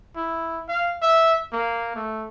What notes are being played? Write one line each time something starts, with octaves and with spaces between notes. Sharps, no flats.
E4
F5
E5
A#3
A3